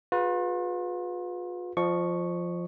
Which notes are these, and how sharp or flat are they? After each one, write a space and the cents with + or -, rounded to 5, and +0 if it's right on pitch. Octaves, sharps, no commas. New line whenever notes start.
F4 +40 G#4 +0 B4 +0
F3 +0 D#5 -45 C#6 +0